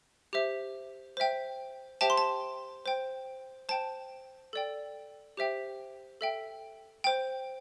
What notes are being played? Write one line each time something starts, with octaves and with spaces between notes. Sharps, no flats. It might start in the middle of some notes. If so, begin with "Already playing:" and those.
G4 C5 E5
C5 E5 G5
G4 C5 E5 G5 A5
C6
A5
C5 G5
C5 G5 A5
A4 D5 G5
G4 C5 E5 G5
A4 E5 G5
C5 G5